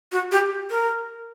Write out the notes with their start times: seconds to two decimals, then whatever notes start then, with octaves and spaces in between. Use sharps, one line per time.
0.12 F#4
0.32 G4
0.70 A#4